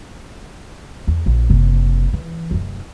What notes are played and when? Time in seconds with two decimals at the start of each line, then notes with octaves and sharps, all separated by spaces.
1.07 E2
1.26 A#1
1.50 F#1 C3
2.13 E3
2.51 F1 F#2